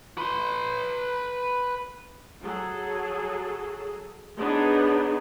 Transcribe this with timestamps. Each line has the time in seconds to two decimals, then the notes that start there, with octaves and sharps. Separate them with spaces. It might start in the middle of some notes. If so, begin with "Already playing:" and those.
0.18 B4 C6
2.43 F#3 G#4 A4
4.38 B3 D4 D#4 G#4 C#5